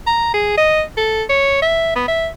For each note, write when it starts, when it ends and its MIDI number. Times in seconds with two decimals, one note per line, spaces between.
0.07 0.32 82
0.34 0.55 68
0.57 0.82 75
0.97 1.23 69
1.29 1.60 73
1.62 1.92 76
1.96 2.04 59
2.08 2.28 76